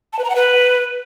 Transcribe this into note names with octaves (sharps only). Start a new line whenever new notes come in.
A5
B4
A#5
F#5
B4